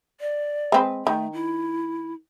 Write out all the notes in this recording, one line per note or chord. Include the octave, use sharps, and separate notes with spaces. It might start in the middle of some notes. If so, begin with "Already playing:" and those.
D5
G#3 C4 B4
D#3 A3
E4